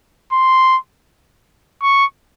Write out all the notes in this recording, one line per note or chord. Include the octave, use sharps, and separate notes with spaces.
C6
C#6